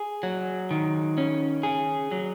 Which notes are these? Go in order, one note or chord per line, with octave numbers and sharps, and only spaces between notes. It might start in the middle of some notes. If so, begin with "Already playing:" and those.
Already playing: G#4
F#3
D#3
C#4
G#4
F#3